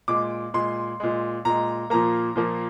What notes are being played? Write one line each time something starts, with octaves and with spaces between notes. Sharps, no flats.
A#2 G#3 D6
A#2 G#3 C6
A#2 G#3
A#2 G#3 A#5
A#2 F3 A#3 A#5
A#2 F3 A#3